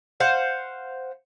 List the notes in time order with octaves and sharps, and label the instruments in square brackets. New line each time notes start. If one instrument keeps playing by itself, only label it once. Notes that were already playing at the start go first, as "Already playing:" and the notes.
[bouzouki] C5 F5 F#5